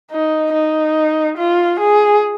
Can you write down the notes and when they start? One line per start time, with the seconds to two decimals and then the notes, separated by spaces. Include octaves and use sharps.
0.11 D#4
0.54 D#4
1.38 F4
1.80 G#4